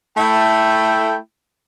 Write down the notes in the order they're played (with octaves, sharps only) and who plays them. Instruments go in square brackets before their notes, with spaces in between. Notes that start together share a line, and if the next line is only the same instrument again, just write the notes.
[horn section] A3 E4 G5